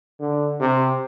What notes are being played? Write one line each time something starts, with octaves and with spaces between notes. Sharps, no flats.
D3
C3